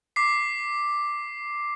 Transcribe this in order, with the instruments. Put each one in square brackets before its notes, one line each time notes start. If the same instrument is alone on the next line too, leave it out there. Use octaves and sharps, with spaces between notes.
[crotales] D6 B6 C7